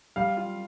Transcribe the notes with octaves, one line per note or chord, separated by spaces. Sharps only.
G3 F5
F4